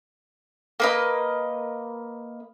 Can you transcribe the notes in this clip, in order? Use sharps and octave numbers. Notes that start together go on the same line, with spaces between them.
A#3 B4 D#5